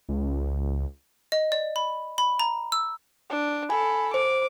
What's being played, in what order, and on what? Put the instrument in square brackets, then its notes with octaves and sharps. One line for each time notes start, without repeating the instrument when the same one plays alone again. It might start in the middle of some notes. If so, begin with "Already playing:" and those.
[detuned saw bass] C#2
[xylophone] D#5
D5
B5
B5
A#5
E6
[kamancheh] D4
[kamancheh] A4 B5 [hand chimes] G#5
[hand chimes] C5 [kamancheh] D6